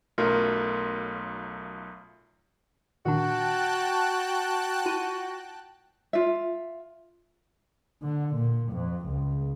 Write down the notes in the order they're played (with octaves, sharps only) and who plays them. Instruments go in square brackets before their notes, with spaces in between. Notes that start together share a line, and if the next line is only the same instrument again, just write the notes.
[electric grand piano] B1 F#2 A3 F4 A#4
[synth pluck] A#2 D#3 D4 [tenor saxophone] F#4 [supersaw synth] G5 A5 F#6
[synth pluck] E4 F4 D#7
[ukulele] F4 E5
[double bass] D3
A#2
F2
C#2